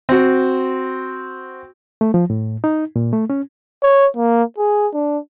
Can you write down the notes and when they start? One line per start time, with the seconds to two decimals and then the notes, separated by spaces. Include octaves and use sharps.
0.09 C4 F#4
2.01 A3
2.14 F3
2.30 A2
2.64 D#4
2.96 A#2
3.13 A3
3.30 C#4
3.83 C#5
4.16 A#3
4.58 G#4
4.94 D4